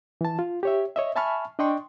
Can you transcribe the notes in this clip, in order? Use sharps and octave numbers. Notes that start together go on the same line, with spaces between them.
E3 A5
F4
G4 C#5 E5
C#5 D#5 E5
E5 G#5 A5 B5 C#6 F6
D4 D5 D#5 G5 C6 C#6